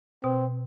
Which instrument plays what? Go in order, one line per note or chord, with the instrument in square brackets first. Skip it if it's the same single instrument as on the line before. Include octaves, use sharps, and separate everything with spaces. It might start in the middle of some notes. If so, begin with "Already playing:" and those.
[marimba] B2 [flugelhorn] C4